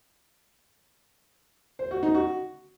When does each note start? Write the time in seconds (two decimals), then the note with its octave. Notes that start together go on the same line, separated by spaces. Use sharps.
1.79 C5
1.91 F#4
2.03 D#4
2.15 F#4